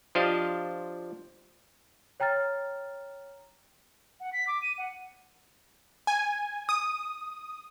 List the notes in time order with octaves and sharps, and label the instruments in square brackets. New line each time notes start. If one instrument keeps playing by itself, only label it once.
[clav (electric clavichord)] F3 D4 G4 C5 D#5 F5
[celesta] C#5 G5 A#5 F6 A6
[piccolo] F#5
B6
D6
D#7
F#5
[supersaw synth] G#5
D#6